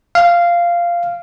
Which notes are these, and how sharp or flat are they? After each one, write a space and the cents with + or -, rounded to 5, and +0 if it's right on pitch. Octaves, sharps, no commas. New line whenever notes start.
F5 -10